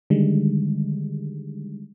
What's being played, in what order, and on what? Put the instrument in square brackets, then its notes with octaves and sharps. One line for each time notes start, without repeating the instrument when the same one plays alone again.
[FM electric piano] D3 D#3 G3 G#3